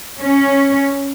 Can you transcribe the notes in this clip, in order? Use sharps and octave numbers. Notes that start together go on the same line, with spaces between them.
C#4